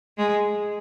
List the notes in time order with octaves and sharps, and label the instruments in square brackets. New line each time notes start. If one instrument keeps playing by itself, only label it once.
[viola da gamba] G#3